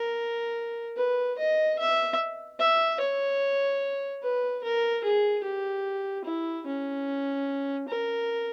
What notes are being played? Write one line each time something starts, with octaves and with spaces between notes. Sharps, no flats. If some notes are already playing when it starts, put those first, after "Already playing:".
Already playing: A#4
B4
D#5
E5
E5
C#5
B4
A#4
G#4
G4
E4
C#4
A#4